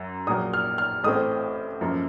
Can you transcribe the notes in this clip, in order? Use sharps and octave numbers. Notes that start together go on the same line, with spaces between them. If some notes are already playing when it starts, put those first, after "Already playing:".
Already playing: F#2 F#3
A#1 A#2 F#3 A#3 D#6
F6
F6
A1 A2 A3 C4 D#6
F#2 F3 A#3